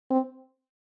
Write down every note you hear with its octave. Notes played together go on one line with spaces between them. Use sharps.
C4